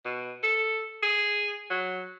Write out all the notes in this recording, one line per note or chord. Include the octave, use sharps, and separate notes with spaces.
B2
A4
G#4
F#3